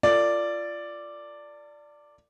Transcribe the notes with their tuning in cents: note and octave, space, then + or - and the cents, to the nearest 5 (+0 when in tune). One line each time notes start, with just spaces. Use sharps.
F4 -20 A4 +45 D5 +0